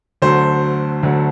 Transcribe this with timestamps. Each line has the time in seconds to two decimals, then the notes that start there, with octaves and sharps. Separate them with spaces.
0.22 D2 D3 F#3 A3 C5
1.03 D2 D3 F#3 A3